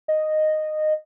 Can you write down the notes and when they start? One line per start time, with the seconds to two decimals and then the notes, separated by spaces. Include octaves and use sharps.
0.08 D#5